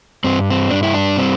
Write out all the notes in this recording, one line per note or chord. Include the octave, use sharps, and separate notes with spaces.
G2 C4
C4
G2 D4
E4
D4
G3 C4